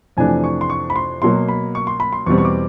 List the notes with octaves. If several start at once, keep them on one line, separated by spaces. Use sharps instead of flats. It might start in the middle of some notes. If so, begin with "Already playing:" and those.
F2 C3 E3 A3 D4 G#5
C#6
C6
C#6
B5
C6
B2 F#3 A#3 C6
B5
C#6
C6
B5
C6
E2 B2 G3 C4 C#6
C#6
D6